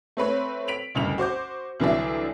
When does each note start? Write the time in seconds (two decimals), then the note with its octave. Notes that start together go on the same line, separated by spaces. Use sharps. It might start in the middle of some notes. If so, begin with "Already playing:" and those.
0.17 A3 C4 B4 C#5
0.68 B6 D7 F7 F#7
0.95 F#1 D2 G2 F7
1.18 F#4 C5 D6 G6
1.80 C2 D3 E3 F#3 D5 E5